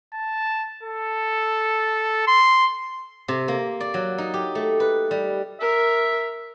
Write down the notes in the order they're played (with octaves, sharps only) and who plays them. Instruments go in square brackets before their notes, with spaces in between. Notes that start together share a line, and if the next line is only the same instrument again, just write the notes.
[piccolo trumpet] A5
A4
C6
[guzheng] C3
A#3
D5
F#3
D#4
G4
A3
B4
G3
[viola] A#4 [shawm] E5